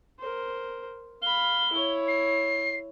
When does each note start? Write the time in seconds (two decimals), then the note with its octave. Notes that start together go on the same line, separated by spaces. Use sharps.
0.19 A#4 C5
1.22 F5 B5 G7
1.73 E4 C#5
2.08 C7